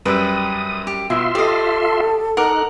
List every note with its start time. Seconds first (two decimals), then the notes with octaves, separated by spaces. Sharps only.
0.05 F#2 G3 B4 G5 D#6 E6
0.87 G4
1.10 B2 E4 F4 E5 C6 E6
1.35 G4 A4 D5 D#5 D#6
2.37 D#4 A#4 F#5 D6 F#6